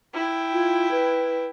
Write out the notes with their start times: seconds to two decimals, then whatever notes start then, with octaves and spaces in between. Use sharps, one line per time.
0.14 E4 G5
0.53 F4
0.91 B4